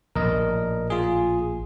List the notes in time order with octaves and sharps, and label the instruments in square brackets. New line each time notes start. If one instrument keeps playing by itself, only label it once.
[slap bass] A#1 A2 [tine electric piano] A#4 D#5
[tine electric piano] F4 G#4